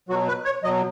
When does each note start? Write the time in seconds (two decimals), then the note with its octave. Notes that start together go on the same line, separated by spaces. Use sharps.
0.09 B2 F#3 F#4
0.28 B4
0.45 C#5
0.63 F#3 D#5
0.67 B2